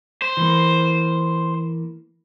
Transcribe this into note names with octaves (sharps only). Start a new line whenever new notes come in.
C5
E3 A#3